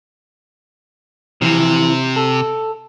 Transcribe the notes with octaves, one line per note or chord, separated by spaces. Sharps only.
C3 E3 F3
A4